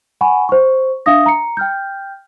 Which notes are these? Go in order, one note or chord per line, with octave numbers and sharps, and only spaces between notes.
F#5 G#5 B5 C#6
C5 C#6
D4 E5 F5 D#6 A#6
A#5 C#7
G5 F6 G6